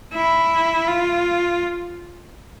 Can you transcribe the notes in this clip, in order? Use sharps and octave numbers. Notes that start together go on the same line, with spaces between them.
E4
F4